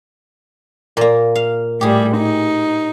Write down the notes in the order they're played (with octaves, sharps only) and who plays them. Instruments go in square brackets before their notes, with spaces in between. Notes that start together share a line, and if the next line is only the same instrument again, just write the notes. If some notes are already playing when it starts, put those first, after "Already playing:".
[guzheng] A#2 A#3
F5
[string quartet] A2 G3 [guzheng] G4 G#4
[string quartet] D#4